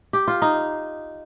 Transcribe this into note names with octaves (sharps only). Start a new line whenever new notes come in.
G4
F4
D#4